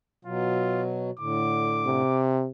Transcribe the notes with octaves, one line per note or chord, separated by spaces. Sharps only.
B2 F#3 F4
A2 D3 D6
C3